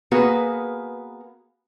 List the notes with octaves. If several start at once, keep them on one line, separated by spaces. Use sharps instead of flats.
A#3 B3 F#4 G#4 B4